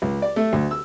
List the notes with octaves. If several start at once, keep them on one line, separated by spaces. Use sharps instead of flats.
C#2
D5
A3
D2
E6